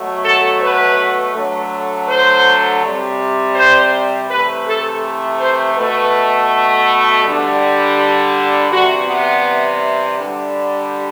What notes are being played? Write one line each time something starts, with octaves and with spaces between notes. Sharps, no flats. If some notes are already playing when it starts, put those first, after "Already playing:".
Already playing: B2 F#3 A3
A4
B4
D3 F#3 A3
C5
C3 G3
C5
C3 E3 A3 B4
A4
C5
B2 A3 B4
D3 G3
C3 E3 G3 F#4
B3
D3 G3